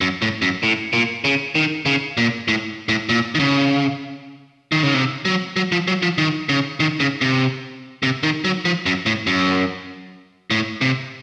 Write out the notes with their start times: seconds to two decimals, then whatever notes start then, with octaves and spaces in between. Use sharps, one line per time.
0.01 F#2
0.22 A2
0.42 F#2
0.63 A2
0.93 A#2
1.24 C#3
1.55 D#3
1.86 C#3
2.17 A#2
2.48 A2
2.89 A2
3.09 A#2
3.35 D#3
3.40 C#3
4.72 D#3
4.83 C#3
4.94 C3
5.25 F#3
5.56 F#3
5.72 F3
5.88 F#3
6.03 F3
6.18 D#3
6.49 C#3
6.80 D#3
7.00 C#3
7.21 C3
8.03 C3
8.23 D#3
8.45 F#3
8.65 F3
8.86 F#2
9.06 A2
9.27 F#2
10.50 A2
10.81 C3